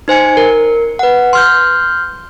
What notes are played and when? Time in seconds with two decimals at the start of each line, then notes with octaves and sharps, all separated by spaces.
0.08 D#4 C5 G#5 C#7
0.37 A#4
0.99 B4 F#5
1.33 C6 F6 G6